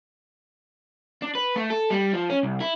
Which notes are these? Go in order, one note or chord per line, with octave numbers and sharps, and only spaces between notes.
D4
B4
A3
A4
G3
F3
C#4
C2
E4